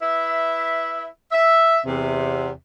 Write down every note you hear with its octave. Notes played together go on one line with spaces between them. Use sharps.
E4 B4 E5
E5
E2 C3